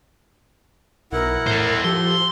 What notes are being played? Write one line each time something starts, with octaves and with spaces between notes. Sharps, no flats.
B1 E4 A#4 F#5
A2 A4 C5
F3 G4 A4 C6